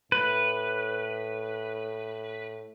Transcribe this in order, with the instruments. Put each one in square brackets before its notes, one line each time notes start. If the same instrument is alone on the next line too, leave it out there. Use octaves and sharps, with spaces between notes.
[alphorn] A2 [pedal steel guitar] B4